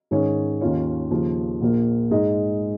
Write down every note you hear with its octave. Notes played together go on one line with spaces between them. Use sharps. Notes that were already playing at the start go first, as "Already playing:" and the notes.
G#2 D#3 C#4 G#4 C#5
D#2 D#3 C#4 F4 C#5
D#2 C#3 F3
A#1 A#2 F3 A#3
G#2 G#3 D#4 G#4 D#5